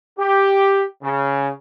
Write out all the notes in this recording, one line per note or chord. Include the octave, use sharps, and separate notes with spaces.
G4
C#3